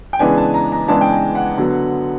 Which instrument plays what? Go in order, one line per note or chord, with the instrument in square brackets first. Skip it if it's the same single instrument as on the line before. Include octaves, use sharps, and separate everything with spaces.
[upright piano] G5
C#3 E3 G#3 B3 D4 G#5
A5
A#5
A#5
C#3 E3 G#3 B3 D4 A5
G5
G#5
F#5
D3 F#3 B3